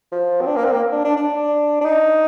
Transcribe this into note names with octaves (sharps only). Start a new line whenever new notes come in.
F3
C4
D4
A#3
C4
A#3
D4
D4
D4
D4
D#4